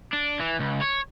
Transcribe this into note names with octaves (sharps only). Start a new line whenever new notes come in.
D4
E3
C#2
C#5